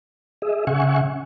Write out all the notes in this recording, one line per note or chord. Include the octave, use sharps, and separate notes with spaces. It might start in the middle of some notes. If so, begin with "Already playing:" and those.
G#4 D#5 E5
C#3 E5 F#5 G#5 C#6